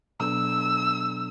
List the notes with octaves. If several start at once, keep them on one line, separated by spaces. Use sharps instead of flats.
B2 F#3 B3 D4 A4 E6